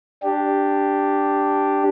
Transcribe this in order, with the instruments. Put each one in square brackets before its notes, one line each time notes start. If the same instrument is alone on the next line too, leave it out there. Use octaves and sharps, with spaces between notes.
[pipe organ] D4 G4